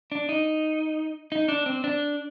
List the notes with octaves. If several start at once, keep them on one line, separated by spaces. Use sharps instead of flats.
D4
D#4
D#4
D4
C4
D4